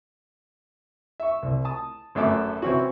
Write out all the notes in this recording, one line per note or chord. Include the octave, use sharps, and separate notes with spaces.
E5 C#6
C2
A5 D#6
G#1 F#2 A3 E5 D6
C3 E3 C4 C#4 F#4